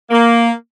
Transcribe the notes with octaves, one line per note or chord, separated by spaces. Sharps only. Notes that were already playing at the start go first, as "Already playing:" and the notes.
A#3